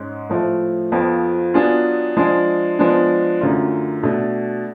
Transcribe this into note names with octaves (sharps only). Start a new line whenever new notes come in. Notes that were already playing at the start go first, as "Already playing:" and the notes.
Already playing: G#2 G#3 C#4
A2 F3 A3
F2 F3 B3
F#3 B3 D4 F4 G#4
F3 G#3 D4 G#4
F3 G#3 B3 D4
F#2 D3 F#3 A3 F4
B2 A3 D4